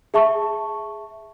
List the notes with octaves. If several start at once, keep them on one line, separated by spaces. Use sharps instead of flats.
G#4 E5 A5 C#6